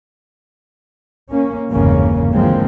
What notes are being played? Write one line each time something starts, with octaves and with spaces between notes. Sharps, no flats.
A#3 C#4
G1 E2 G#2 C#3 A#3 C#4
D3 E3 F3 G#3 A#3 C4